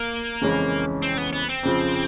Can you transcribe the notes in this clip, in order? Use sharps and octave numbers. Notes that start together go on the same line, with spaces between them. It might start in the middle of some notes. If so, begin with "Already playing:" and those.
Already playing: A#3
F2 C#3 E3 G#3 C#4
C4
B3
B3
C4
F2 C#3 F3